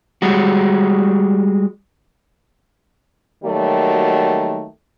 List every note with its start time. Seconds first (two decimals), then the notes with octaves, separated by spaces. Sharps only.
0.22 G3 G#3 F#4
3.43 D#3 F#3 G3 A3 A#3 F#4